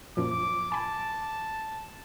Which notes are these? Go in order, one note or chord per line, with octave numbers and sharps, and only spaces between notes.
F#2 A#2 F3 D6
G#5 A5 B5